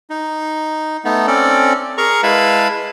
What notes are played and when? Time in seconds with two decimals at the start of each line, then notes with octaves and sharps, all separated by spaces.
0.10 D#4
1.05 A3 B3 D#4
1.27 C4 C#4 A4 D5
1.98 G#4 A#4 A#5 C#6
2.23 G#3 E4 B4 F5 A5 B5